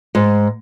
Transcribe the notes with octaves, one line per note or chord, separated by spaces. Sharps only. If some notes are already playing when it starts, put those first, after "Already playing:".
G#2